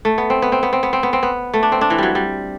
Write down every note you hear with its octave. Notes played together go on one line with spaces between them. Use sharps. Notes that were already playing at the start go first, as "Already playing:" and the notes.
A3
B3
C4
B3
C4
B3
C4
B3
C4
B3
C4
B3
A3
D4
C4
D4
E3
F#3 G3
G3